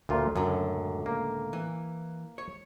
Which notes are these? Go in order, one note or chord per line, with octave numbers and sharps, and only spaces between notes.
D2 A#2 F4
C#2 F#2 A2 D3
A#3
E3
C#5